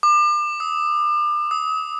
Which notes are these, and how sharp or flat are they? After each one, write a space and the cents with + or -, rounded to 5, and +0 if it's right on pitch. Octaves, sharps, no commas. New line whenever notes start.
D6 +35
D#6 +45
D#6 +40